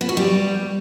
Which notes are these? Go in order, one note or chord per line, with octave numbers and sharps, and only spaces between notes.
B3
F#4
G3